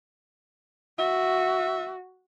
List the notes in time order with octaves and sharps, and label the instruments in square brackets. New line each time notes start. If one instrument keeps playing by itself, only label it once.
[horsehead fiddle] F#4 [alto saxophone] E5